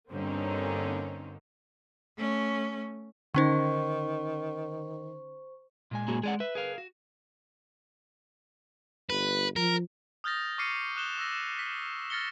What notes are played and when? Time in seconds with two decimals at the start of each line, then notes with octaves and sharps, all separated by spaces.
0.10 G2 D3 A#3 C4 C#4 D#4
2.17 A3 C#4
3.34 D3 D#3 C#4 D#4 C5 C#6
5.91 A#2 G#3 G#5
6.08 A#3 F#4 G#4
6.23 G#3 G#4 D5 F#5
6.40 B4 E5
6.55 G#4 A#4 F5
6.78 F#4
9.10 G1 B4
9.56 F3 A#4
10.24 D#6 F6 G6 A6 A#6
10.58 C#6 D6 F6 C7 C#7 D#7
10.96 D#6 F#6 E7 G7
11.18 D6 E6 A#6
11.59 B6
12.10 F6 A6 A#6 C#7 G7